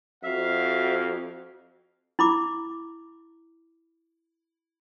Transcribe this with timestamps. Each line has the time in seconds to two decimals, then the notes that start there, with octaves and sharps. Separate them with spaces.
0.23 F2 F#4 E5 F5
2.19 E4 B5 D6